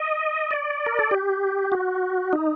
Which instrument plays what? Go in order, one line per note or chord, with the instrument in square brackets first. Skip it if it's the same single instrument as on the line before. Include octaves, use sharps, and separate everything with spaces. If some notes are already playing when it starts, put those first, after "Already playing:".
Already playing: [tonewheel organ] D#5
D5
A#4
A4
G4
F#4
D#4